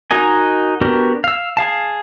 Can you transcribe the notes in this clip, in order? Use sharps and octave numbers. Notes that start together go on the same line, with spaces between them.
D#4 F#4 A#4 D#5 G#5
B3 D4 F#4 G4 A#4
F5 E6
G#4 F5 A5